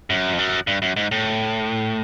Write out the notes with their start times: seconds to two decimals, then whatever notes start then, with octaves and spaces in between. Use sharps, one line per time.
0.10 F#2
0.33 F2
0.39 F#2
0.67 G2
0.82 F#2
0.96 G#2
1.11 A2